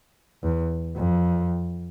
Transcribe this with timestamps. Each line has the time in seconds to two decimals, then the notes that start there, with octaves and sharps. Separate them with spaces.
0.43 E2
0.96 F2